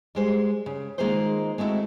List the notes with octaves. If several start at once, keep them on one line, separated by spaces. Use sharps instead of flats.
G3 G#3 C5
C#3
D#3 G#3 A#3 F4 G#4 C5
G#3 A3 C4 E4 F#4